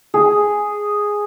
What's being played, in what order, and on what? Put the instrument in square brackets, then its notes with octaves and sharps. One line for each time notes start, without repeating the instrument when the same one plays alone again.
[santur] G#4